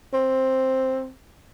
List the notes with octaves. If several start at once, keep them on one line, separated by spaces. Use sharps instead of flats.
C4